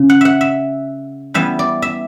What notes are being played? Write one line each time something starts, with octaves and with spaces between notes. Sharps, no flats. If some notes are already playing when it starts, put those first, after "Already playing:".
Already playing: C#3
F#5
E5 F#5
E5
E3 G3 B3 E5
D5
E5